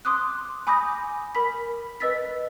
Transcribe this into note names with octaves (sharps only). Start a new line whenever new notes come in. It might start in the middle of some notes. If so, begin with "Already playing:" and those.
C6 D6 D#6 F#6
G#5 B5 D6 D#6 G6 A#6
A#4 B5 B6
B4 D#5 E6 A6 B6